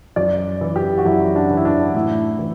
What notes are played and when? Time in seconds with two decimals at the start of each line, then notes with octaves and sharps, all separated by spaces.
0.16 F#2 D5
0.61 E3
0.76 G4
0.98 F#4
1.06 F#2 E4
1.36 D4
1.50 E3
1.57 E4
1.65 D4
1.95 A2 E4
2.39 E3